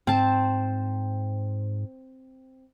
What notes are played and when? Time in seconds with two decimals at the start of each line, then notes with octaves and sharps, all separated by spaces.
0.07 G#2 C4 A5